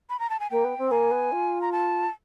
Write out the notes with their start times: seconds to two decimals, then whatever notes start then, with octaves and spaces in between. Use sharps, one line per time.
0.10 B5
0.20 A#5
0.30 A5
0.40 G#5
0.50 A#3 G5
0.64 B3
0.78 C4
0.90 A#3 G#5
1.11 B3
1.32 F4
1.62 A#5
1.72 A5